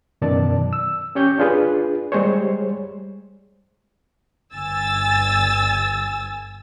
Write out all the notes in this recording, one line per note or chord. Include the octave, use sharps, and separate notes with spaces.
F#2 B2 D#3 D5 A5
E6
C#4 G4 C#5 G6
D4 F4 G#4 B4
G3 G#3 G#4 C5 C#5
G1 G#5 E6 A6